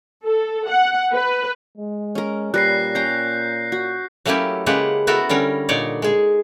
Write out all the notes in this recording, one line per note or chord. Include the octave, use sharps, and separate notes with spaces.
A4
F#5
B4
G#3
C#4 A#4
A#2 G3 B4 F#6 A#6 C7
C#4 G5 A#5 G6 C7
F#4
F#3 A3 A#3 C#4 E4 G4
C#3 G#3 A#3 G4 B4 F#5
B3 E4 F#4 A4 A#4
D3 G3 C#4 A#4
A#2 D3 D#4 C#5 D5
G#3 G#4